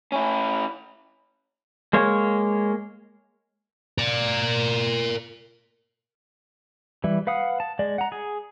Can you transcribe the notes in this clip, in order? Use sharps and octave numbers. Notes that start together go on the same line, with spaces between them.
C#4 E4
G#3 A#3 C#5
A#4 D5
E3 G3 E4
B4 F5 F#5 D#6
A5
G#3 D5
F#5 A#5
G#4